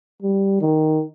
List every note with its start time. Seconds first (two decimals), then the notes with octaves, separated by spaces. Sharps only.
0.22 G3
0.60 D#3